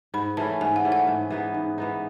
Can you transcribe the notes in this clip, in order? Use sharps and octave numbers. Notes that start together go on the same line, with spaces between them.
G#2 B5
E3 A3 C#4 A5
G#2 G#5
F#5
E3 A3 C#4
F#5
G#2
E3 B3 D#4
G#2
E3 B3 D#4